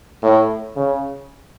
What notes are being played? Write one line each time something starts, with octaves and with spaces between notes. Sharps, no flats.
A2
C#3